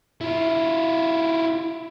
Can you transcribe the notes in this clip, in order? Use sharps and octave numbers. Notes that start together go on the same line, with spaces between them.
E4 F4